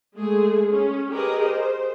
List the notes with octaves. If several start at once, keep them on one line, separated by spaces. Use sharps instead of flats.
G#3 A3 G#4
C#4
G4 G#4 A#4 B4 D#5
C5